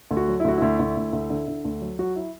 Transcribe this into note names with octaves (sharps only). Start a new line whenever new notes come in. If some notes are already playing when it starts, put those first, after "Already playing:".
D2
F#4
F#3
E4
D2 F#4
D2 E4
D2
D2
D2
D3
D3
D2
F#3
F#3 F#4
E4